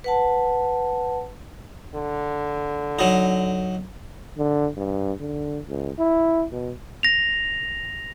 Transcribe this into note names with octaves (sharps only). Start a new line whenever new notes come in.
B4 F#5 A5
D3
F#3 D#4
D3
G2
D3
C#2
E4
B2
A#6 F7